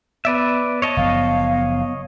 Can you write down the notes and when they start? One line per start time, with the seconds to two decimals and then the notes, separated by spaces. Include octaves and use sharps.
0.25 B3 B4 D5 E5
0.82 C#5 D#5 A5
0.97 F#1 F3 B3 F5